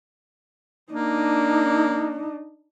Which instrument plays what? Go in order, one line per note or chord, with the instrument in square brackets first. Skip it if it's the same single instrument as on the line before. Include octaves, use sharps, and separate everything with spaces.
[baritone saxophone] A#3 [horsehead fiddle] D4 D#4